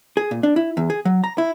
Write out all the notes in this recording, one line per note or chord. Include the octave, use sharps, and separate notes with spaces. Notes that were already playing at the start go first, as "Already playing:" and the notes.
G#4
A#2
D4
E4
E2
G#4
F#3
A#5
E4